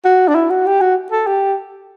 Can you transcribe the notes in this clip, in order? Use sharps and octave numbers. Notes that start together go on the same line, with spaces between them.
F#4
D4
E4
F#4
G4
F#4
A4
G4